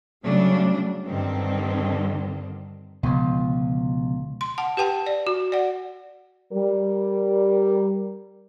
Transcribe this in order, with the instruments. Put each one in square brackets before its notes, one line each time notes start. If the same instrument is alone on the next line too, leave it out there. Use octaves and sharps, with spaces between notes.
[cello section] C#3 F#3 G3 A3 D4
G2 D3 D#3 C4
[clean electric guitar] C#2 [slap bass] B2 D3 F3
[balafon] C6
F#5 A5
G4 B4 G5 A5
D5
F#4
D5 F#5
[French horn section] G3 A#4